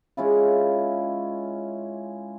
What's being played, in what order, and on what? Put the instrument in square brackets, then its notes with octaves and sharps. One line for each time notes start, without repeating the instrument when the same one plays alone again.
[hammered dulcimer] G#3 C#4 E4 F4